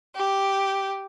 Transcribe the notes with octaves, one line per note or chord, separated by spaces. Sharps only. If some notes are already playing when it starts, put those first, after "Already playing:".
G4